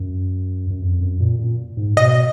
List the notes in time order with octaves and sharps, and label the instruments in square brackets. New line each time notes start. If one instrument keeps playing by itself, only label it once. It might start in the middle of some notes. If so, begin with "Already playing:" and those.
Already playing: [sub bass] F#2
F#2
F2
F#2
A#2
A#2
G#2
[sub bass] B2 [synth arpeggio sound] D#5